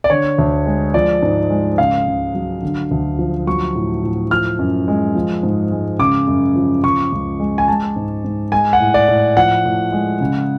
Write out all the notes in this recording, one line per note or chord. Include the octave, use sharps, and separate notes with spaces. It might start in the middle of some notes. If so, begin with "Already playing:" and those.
D5
D3 C#5
D2
G#3
F3 D5
G#2
G#3
C#3 F5
C#2
F#3
D3
D2
F3
F#3 C#6
A2
A2
F3 F6
F#2
G#3
F3
G#2
G#3
C#3 D6
F#2
F3
C#3 C#6
C#2
G#3
G#5
G#3 A5
G#2
G#2
G#3 G#5
F#5
A2
D5
A2
F3 F#5
A2
G#3
C#3